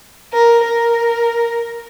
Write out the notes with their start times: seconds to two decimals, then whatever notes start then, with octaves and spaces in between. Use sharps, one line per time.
0.33 A#4
0.64 A#4